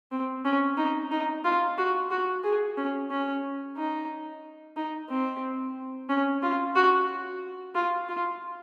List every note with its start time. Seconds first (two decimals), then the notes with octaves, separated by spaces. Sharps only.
0.12 C4
0.45 C#4
0.78 D#4
1.11 D#4
1.44 F4
1.78 F#4
2.11 F#4
2.44 G#4
2.77 C#4
3.10 C#4
3.77 D#4
4.77 D#4
5.10 C4
6.09 C#4
6.43 F4
6.76 F#4
7.75 F4
8.09 F4